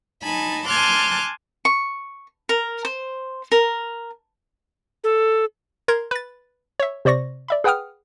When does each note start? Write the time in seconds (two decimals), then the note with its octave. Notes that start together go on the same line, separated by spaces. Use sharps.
0.23 D#4 G#5 A5 B5
0.67 G#5 A5 C6 D6 F6 F#6
1.65 C#6
2.49 A#4
2.85 C5
3.52 A#4
5.04 A4
5.88 A#4 A#5 C6 G#6
6.11 B4 A6
6.80 C#5 E5
7.05 C3 C5 D5 C#6 A#6
7.48 D5 E5 B5
7.64 G#4 B4 F#5 G5 D#6 F6